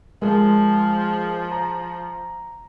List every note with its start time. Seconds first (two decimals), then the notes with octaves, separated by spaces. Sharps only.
0.22 F3 G#3 A#4
1.52 A#5